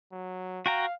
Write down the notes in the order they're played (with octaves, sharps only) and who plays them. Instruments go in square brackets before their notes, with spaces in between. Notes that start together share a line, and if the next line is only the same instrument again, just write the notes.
[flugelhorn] F#3
[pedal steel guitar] F#4 G5 A#5 [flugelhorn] F5